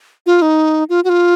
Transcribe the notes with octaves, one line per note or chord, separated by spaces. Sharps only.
F4
D#4
F4
F#4
F4